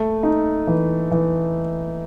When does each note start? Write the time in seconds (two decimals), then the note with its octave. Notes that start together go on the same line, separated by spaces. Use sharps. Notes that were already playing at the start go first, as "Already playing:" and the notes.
Already playing: A3
0.23 D#4
0.67 E3
1.11 E3